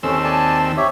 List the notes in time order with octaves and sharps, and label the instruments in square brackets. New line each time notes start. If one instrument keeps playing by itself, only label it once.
[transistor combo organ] D#2 C4 E6 [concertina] C#4 A4
[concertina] D5 G#5 A5
G4 C#5 E5